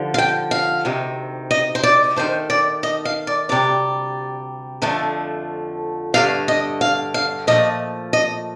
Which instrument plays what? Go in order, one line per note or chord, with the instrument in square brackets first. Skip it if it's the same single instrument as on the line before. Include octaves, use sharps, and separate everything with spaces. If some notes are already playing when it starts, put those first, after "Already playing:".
Already playing: [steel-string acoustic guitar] D#2 D3 F3
F5
G5
F5
D2 C3 D#3
D#5
C5
D5
D#2 D#3 A3 C5
D5
D#5
F5
D5
D2 C3 G3 D5
F2 D3 F3 A3
G2 D3 A3 F5
D#5
F5
F5
A#2 F3 A3 D#5
D#5